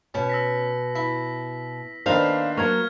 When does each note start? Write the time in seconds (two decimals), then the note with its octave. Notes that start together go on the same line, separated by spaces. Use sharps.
0.14 B2 C#4
0.29 E6 A#6 B6
0.95 E4 B6
2.06 A#2 D#3 B3 D4 C5 F5
2.57 F#3 A#3 C#6 F6 G#6